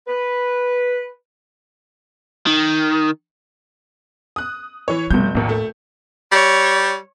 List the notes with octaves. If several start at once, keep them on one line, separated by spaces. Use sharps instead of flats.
B4
D#3
D#6 F#6
E3 C#5
F1 B2 G3 G6
A#1 D#2 A2
A3
G3 C#5